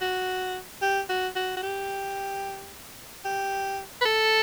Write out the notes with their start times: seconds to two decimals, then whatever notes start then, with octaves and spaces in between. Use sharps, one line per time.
0.01 F#4
0.82 G4
1.09 F#4
1.35 F#4
1.57 F#4
1.63 G4
3.25 G4
4.01 B4
4.05 A4